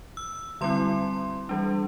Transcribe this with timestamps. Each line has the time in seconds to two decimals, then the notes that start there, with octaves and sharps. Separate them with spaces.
0.17 E6
0.61 D3 G3 C4 E4 C6
1.49 E3 G3 D4